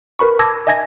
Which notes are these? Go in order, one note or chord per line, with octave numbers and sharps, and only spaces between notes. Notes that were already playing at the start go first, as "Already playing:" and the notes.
A#4 B4 B5 C#6
A5 D6 E6 G#6 A#6
D#5 E5 G#5 G#6 A#6